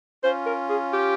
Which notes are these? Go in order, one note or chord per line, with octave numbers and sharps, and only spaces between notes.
C#4 F4 C5
A#4
G#4
G4